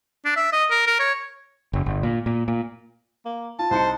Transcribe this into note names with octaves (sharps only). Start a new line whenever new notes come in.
D4
E5
D#5
A#4
A#4
C#5
F#1
G1
A#2
A#2
A#2
A#3
F4 A5
C2 D#4 C5 C#7